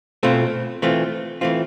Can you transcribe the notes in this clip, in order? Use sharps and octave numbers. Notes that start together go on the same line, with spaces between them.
B2 A3 C4 F4
E3 A3 C4 F4
E3 A3 C4 F4